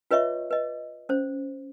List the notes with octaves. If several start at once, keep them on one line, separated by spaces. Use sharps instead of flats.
F4 B4 C#5 D#5 E5 C#6
B4 D#5
C#4 C5